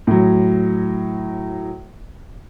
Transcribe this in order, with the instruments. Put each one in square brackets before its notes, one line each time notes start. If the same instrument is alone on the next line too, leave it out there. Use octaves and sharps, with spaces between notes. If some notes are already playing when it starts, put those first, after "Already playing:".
[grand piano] A2 F#3